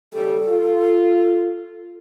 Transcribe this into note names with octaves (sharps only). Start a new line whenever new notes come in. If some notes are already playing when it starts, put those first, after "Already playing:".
D#2 C#3 G3 A4
F4